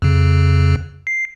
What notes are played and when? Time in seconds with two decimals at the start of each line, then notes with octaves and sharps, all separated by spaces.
0.02 F2 C#3
1.07 C7